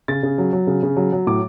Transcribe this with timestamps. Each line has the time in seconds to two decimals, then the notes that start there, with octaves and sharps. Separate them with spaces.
0.08 C#3 A6
0.23 C#3
0.38 F#3
0.53 F#3
0.67 C#3
0.83 C#3
0.97 F#3
1.12 F#3
1.27 A2 D6